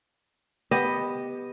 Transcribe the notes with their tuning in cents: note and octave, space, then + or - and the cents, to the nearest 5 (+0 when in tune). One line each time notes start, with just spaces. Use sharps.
B3 +0 G4 +10 D#5 +0